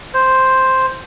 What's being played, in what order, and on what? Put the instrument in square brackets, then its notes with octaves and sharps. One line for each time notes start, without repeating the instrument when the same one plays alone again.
[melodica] C5